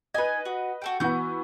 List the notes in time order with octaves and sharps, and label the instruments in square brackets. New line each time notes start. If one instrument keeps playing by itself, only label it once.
[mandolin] D#4 G#5 [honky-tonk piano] B4 D#5
[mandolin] F#4
F#4 A4 G5
[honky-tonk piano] E3 B3 [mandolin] F#4 D#6 G6